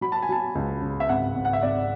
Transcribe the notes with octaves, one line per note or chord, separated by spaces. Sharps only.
F#3 B5
A5
G#5
F#3 A5
C#2
C#3
E5
G#1 F#5
G#1
F#5
E5
G#1 D5